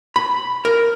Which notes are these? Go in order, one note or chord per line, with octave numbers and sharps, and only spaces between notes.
B5
A#4